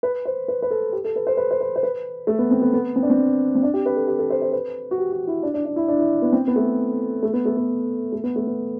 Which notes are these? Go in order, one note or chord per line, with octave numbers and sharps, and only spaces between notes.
B4
C5
B4
B4
A4
G4
A4
B4
C5
B4
C5
B4
C5
B4
A3
B3
C4
B3
B3
C4
D4
C4
C4
D4
G4
B4
A4
G4
A4
C5
C5
B4
F#4
G4
F#4
E4
D4
D4
D4
E4
D4
E4
B3
C4
B3
A3
A3
B3
A3
B3
A3
B3
A3
B3